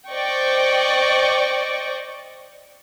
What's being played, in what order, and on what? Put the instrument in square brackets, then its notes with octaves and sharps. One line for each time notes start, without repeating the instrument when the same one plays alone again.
[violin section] C5 D5 D#5 G5 C#6